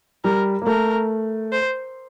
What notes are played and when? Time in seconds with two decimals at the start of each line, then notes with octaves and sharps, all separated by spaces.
0.24 G3 A#4
0.62 A#3
0.67 A3 A#4
1.52 C5